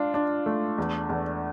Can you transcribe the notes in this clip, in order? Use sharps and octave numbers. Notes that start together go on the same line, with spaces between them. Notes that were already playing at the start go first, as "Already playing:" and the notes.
Already playing: D4 F4
D4
A3
E2
E2